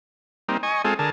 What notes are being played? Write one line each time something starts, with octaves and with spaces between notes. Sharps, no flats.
G3 A#3 C4 D#4
D#5 G#5 C#6
G#3 C4 F4 G#4 A4
D3 G#4 A#4 A5